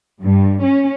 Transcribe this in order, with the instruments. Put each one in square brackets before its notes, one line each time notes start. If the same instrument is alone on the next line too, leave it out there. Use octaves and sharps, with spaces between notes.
[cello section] G2
C#4